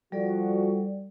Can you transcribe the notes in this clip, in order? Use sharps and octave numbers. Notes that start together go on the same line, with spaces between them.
F3 G3 F#4 A4 D5